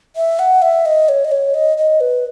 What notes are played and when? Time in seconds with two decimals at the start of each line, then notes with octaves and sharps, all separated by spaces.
0.16 E5
0.39 F#5
0.62 E5
0.86 D#5
1.09 C#5
1.25 D#5
1.32 C#5
1.54 D#5
1.78 D#5
2.01 B4